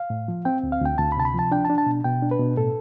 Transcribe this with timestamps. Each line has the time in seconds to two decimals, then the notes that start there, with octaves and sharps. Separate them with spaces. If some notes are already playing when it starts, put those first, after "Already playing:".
Already playing: F5
0.10 A2
0.28 F3
0.45 C4 G5
0.63 D2
0.72 F5
0.81 D2 G5
0.98 D2 A5
1.12 B5
1.17 C3 A5
1.25 B5
1.34 F3 A5
1.52 D4 G5
1.65 A5
1.70 D4
1.78 A5
1.86 B2
2.04 B2 G5
2.22 D4
2.31 B4
2.40 B2
2.57 A2 A4